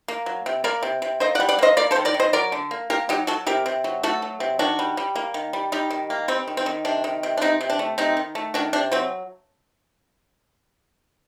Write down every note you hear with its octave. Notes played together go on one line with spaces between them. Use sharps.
A#3
F#3
C3
A#3 A#4 D5
C3
C3
A#3 C5 D#5
D5 F#5
G3
D5 F#5
A#3 C5 D#5
A#3 A#4 D5
A4 C5
D#3
A#4 D5
D#3
C5 D#5
F#3 A#4 D5
D3
A#3
A#3 G4 A#4
F#3 D#4 G4
F#3 F#4 A4
C3 G4 A#4
C3
F#3
A3 F#4 A4
F#3
C3
D#3 D4 F#4
G3
G3
A#3
D#3
G3
G3 D#4 G4
D#3
A#3
G3 C4
D#3
C4
D#3
C3 D4
D#3
C3
D4
C3 C4 D#4
C3
D4
A3
C3 C4 D#4
D#3
A3
D#3 D4 F#4
C3 D4
F#3 C4